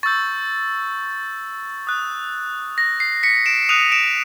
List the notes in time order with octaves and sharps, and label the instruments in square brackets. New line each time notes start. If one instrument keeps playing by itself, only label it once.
[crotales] C#6 E6 G6 A6
D#6 F#6
A#6
C7
B6 C#7
D7 E7
D#6 F#6 D#7 F7
D7 E7